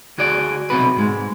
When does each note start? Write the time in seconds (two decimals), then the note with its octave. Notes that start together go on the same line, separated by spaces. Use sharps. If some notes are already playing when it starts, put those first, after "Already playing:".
0.18 D2 F#4 G#4 D5
0.70 B1 C3 F#4 B4
0.97 G#2 G#3